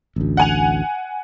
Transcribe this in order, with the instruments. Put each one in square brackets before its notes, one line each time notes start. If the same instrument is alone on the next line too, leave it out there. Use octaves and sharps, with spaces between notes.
[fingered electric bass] A1 D2
[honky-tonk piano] F#5 G#5 F7